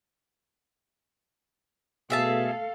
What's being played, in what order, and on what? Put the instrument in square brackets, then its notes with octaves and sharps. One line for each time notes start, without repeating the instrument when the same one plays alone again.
[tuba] B2 [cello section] A3 A4 F5 [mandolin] G#4 E5 A5